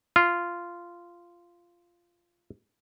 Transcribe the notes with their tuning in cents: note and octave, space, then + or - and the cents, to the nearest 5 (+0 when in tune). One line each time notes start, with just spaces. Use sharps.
F4 -10